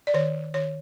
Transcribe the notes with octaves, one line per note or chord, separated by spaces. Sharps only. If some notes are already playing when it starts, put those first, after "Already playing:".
D5
D#3 C#5
D#3 C#5